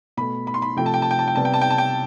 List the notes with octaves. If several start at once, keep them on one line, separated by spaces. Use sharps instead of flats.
B2 A3 B5
B5
C6
B5
C3 F3 A3 G5
A5
G5
A5
G5
A5
G5
C3 G3 B3 A5
G5
A5
G5
A5
G5